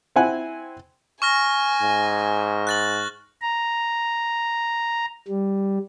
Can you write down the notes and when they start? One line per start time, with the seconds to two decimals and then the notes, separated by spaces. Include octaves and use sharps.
0.16 C4 E4 F#5 G#5 F#6
1.22 G#5 C#6 F6 A#6
1.81 G#2
2.67 F#6 A6 F#7
3.42 A#5
5.28 G3